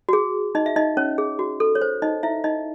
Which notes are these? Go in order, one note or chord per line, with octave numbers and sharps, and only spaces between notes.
F#4
G#4
D#4 D#5
E5
D#4 D#5
C#4 C#5
G#4
F#4
A4
C#5
C5
D#4 D#5
E4 E5
D#4 D#5